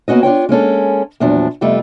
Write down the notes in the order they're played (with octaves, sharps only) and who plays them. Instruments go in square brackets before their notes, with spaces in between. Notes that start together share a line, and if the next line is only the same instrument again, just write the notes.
[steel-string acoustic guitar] A#3 B3 C#4 F#4 D#5
D4 F4 C#5 G5
G#3 A#3 C#4 A4
E2 A#2 F3 F#3 D4
F2 C3 G3 A3 B3 F4